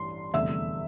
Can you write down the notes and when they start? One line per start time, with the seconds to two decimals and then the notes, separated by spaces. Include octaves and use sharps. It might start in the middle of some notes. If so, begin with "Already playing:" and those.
Already playing: A1 G2 C6
0.34 F1 E2 D3 G3 E5 E6